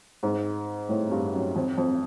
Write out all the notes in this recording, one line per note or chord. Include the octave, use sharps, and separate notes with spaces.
G#2
A2
G2
F#2
F2
F2